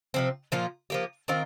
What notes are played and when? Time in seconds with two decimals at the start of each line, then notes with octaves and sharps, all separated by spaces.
0.14 C3 F3 C4
0.52 A#2 F3 A#3 F4
0.90 F3 A#3 G4
1.28 D#3 C4 F4 A#4